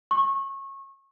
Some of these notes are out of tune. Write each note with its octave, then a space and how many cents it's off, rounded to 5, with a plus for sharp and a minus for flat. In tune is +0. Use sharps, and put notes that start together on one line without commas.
C#6 -25